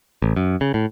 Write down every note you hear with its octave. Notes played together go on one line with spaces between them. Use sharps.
A1
F#2
C#3
A2